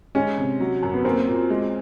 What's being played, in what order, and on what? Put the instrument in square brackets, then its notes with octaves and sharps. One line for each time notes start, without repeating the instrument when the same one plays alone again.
[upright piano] G#3 [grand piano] C#4
[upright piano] C3
F#3
F#2
[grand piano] B3
[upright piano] A#3 [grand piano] C4
[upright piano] A#2
G#3